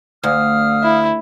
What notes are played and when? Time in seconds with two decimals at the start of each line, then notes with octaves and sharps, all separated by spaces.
0.23 D2 F5 D#6 F6
0.83 E4